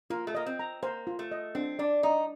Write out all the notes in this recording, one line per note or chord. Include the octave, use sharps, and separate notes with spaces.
A#3 F4
A3
A#3 D#5
C4
A#5
A#3 C5
F4
A3
D#5
C4 D4
D4 D5
D4 D#4